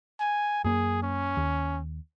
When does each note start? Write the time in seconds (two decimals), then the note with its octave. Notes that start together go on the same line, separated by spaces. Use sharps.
0.20 G#5
0.64 F#2 A#3 G#4
1.03 C#4
1.37 D#2